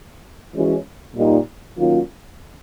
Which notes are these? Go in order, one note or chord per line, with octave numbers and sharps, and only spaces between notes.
E3 G#3 C#4 F#4
A#2 G3 A#3 D#4
D#3 F#3 A#3 C#4 F4